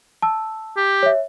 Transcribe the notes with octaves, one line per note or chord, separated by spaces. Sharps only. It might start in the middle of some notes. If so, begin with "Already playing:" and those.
A5 E6
G4
C#5 E5